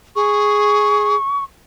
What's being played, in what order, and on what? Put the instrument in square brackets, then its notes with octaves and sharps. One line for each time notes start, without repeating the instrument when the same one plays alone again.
[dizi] G#4 [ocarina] C#6